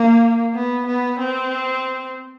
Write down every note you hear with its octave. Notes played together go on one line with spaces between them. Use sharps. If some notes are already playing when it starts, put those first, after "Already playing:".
Already playing: A#3
B3
B3
C4